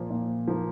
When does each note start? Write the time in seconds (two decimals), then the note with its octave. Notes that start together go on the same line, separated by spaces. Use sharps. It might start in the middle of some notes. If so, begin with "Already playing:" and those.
Already playing: A#2 F3 A#3
0.10 A#2
0.48 F3 A#3